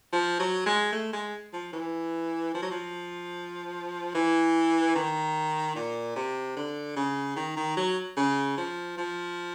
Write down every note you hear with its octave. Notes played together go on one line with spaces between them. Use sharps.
F3
F#3
G#3
A3
G#3
F3
E3
F3
F#3
F3
E3
D#3
A#2
C3
D3
C#3
D#3
D#3
F#3
C#3
F3
F3